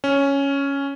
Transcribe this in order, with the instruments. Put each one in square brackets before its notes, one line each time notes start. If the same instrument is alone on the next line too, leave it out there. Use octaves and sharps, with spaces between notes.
[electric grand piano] C#4